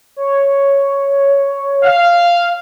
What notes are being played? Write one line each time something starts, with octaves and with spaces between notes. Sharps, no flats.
C#5
F5